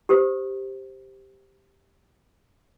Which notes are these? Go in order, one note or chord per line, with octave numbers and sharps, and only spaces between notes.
G4 A#4 C5